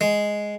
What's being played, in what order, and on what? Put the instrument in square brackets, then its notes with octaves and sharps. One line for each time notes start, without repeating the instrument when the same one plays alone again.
[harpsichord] G#3